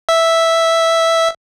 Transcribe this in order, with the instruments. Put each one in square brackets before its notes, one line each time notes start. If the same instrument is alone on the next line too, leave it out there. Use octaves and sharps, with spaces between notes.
[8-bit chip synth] E5